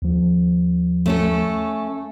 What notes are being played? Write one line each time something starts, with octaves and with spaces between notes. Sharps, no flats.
D#2 F3
A3 C#4 A4